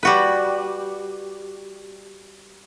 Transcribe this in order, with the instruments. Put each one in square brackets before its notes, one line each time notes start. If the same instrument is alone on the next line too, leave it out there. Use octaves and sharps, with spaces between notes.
[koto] G3 F#4 B4